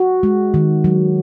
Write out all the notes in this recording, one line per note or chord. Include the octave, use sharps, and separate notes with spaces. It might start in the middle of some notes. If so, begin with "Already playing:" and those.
Already playing: F#4
G#3
D#3
F#3